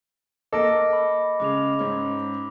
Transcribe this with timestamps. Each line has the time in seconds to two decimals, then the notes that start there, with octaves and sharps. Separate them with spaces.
0.53 A#3 A4 D#5 D6 A#6 D7
0.93 B5
1.40 C#3 G#3 D6 F7
1.79 G#2 C#4